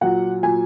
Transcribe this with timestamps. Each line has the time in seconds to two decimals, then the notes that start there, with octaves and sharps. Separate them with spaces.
0.01 A#2 F#3 F#5
0.43 A#2 F#3 G#5